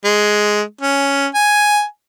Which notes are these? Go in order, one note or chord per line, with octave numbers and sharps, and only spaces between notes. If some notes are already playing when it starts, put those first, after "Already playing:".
G#3
C#4
G#5